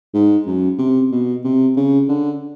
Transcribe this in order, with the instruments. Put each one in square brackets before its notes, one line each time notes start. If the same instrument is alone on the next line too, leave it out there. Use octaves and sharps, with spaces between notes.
[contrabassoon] G#2
F#2
C3
B2
C3
C#3
D3